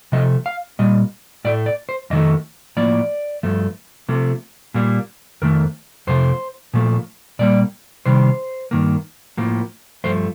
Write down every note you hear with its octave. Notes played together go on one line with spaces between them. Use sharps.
C3 F3 A3 D#5
F5
A#2 G3 D#5
A2 A3 D5
D5
C5
F2 D#3 A3 D#5
A2 F3 A#3 D5
G2 F3 A3
C3 F3 A3
A#2 G3 A#3
F2 D#3 A3 A#4
F2 C3 F3 A3 C5
A#2 F3 A3
A#2 G3 A#3 D5
C3 D#3 G3 C5
G2 D#3 A#3
A2 F3 A#3
G2 F3 A3 C5